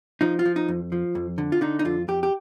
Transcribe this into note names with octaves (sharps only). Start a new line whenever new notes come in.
F3 D#4
F4
F3
D#4
F2
F3
F2
D3
F4
D3 D#4
D#4
F2 F4
F2 G4
G4